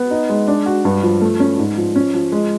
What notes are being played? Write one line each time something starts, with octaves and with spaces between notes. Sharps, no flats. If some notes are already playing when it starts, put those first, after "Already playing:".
Already playing: B3
D#4
G#3
D4
F#4
G2
F3
A3
C#4
G#2
F3
C#4
F3
G#3